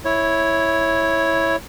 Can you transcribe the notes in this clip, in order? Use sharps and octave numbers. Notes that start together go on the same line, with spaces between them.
E4 C#5